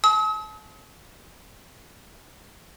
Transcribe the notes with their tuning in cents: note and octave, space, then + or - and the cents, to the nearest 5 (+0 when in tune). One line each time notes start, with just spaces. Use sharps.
A5 -40 D#6 +45